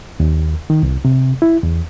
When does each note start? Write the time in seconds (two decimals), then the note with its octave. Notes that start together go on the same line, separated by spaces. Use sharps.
0.20 D#2
0.70 D#3
0.83 C2
1.05 C3
1.42 E4
1.63 E2